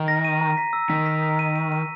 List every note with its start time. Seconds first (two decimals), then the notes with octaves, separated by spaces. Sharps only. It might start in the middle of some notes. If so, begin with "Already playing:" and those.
Already playing: D#3
0.08 A#6
0.25 D#7
0.41 A#5
0.57 B6
0.73 E6
0.90 D#3 B6
1.06 B6
1.23 B6
1.39 D#7
1.56 D#7
1.72 D#7